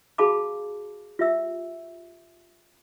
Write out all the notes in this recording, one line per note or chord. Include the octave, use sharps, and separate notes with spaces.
F#4 G#4 F5 A5 B5 D6
F4 G4 E5 E6